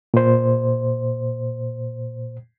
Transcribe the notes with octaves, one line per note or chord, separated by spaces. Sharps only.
A#2 C5